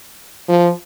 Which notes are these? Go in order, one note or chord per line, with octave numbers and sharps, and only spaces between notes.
F3